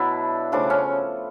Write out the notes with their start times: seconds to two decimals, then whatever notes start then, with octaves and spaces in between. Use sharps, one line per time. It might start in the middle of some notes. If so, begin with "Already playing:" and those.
Already playing: B2 F#3 B3 D4 E4
0.52 C#3 F3 A3 D4
0.70 C#4